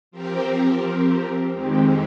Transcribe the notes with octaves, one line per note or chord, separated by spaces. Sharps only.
F3 C4 G4 A#4
F2 D#3 G#3 C4 G4